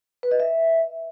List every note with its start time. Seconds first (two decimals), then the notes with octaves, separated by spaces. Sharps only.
0.23 B4
0.31 D#5
0.40 E5